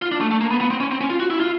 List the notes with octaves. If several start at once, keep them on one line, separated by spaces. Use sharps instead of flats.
F4
D4
A3
A3
A#3
B3
B3
C4
C#4
C4
C#4
F4
F#4
E4
F4